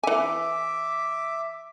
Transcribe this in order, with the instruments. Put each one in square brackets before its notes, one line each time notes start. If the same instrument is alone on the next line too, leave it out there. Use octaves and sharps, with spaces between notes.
[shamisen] E3 G#5 [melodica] E5 D6